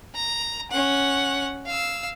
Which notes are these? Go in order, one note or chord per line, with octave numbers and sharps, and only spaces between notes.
A#5
C#4 F#5
F5 E6